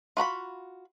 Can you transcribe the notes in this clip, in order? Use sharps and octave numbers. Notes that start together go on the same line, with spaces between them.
F4 F#4 A#5 B5